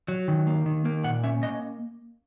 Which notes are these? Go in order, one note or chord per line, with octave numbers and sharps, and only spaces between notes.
F#3
D#3
A#3
D#3
A#3
A#2 F#5
C#4 E5
A#3 D#5